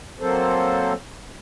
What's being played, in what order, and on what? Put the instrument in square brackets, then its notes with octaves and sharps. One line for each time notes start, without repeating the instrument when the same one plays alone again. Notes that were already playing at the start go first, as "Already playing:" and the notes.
[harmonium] F#3 A#3 C4 A4 C5